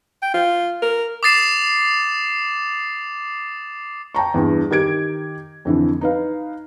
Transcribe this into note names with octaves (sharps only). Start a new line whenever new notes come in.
G5
F4
A#4
D6 D#6 A6 C7 E7
G5 A5 A#5 C#6
E2 G2
D#3 G4 A#4 G#6 D7
F2 D3 E3
D#4 B4 F5